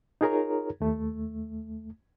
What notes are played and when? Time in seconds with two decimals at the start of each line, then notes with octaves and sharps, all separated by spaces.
0.21 D#4 F4 G#4 A#4 C#5 A#5
0.80 D#2 A3